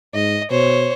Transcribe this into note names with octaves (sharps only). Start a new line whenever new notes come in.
G#2 D#5
B2 C5 C#5